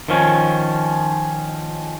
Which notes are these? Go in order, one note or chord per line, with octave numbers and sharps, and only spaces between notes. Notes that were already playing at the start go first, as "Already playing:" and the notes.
D#3 F3 C#4